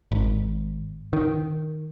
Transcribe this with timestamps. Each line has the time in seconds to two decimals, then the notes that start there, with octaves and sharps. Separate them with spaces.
0.12 G#1
1.13 D#3